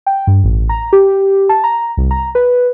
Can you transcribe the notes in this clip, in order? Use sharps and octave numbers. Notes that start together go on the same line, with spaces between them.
G5
G2
A1
A#5
G4
A5
A#5
C2
A#5
B4